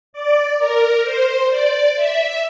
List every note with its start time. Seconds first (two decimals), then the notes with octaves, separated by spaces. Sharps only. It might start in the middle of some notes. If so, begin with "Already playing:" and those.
0.13 D5
0.58 A#4
1.04 C5
1.50 D5
1.96 E5